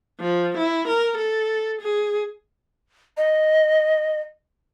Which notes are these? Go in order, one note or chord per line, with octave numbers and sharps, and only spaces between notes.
F3
E4
A#4
A4
G#4
D#5